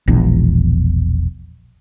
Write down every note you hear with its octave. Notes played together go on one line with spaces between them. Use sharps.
E1 A#1 E2